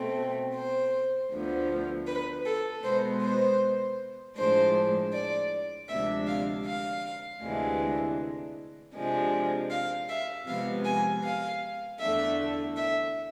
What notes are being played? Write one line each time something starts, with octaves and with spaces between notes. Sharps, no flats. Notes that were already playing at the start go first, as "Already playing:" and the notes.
Already playing: B2 A3 C4
C5
D2 D3 F3 B3
B4
A4
B2 G#3 B3 C5
C5
A2 F3 G#3 D4 C5
D5
D2 C3 F3 G#3 D4 E5
F5
F5
D2 C3 E3 G#3 D4
C3 F3 G#3 D4
F5
E5
C3 F3 G#3 B3 F5
G#5
F5
E2 D3 A3 E5
E5